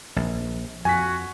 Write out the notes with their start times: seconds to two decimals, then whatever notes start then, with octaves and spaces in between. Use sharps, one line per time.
0.16 A#1
0.85 F2 F#4 G#5 B6